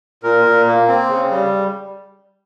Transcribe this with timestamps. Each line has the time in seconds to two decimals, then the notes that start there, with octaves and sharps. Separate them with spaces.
0.23 A#2 A#4
0.45 A#2
0.67 A#3
0.88 C4
1.09 C#3
1.31 G3